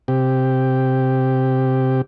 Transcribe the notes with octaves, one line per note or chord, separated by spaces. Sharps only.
C3 G4